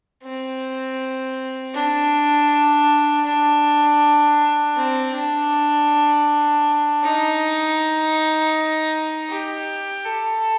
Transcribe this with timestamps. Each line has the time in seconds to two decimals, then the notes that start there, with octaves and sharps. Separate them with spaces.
0.23 C4
1.74 D4
3.26 D4
4.77 C4
5.14 D4
7.03 D#4
9.30 G4
10.06 A4